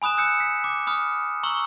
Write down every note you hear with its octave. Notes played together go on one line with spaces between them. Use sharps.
G#5 B5 D#6 F#6 E7
D#6 E6 F#6 G6 C#7
B6
D6
B5 D#6 F6
A#5 C#6 E6 F#7 G7